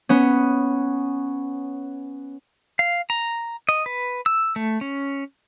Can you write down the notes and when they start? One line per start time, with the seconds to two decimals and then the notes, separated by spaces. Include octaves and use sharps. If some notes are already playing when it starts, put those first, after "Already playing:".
0.09 B3 C#4
2.79 F5
3.10 A#5
3.69 D#5
3.86 B4
4.26 E6
4.56 A3
4.81 C#4